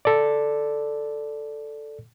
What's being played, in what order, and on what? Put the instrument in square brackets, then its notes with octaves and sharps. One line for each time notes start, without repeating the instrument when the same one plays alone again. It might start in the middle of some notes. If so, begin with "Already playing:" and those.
[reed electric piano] A4 D5